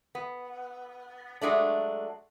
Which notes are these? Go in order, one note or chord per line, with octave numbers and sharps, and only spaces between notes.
B3
F#3 G#3 A3 D4